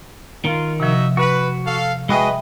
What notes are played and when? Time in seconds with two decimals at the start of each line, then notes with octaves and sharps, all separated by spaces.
0.45 D#3 F4
0.80 C3 F3 D#4 F#4 E5
1.17 F#4 B4
1.66 A4 F5
2.09 G#3 F#4 G#4 B4 D#5 E5 G5 B5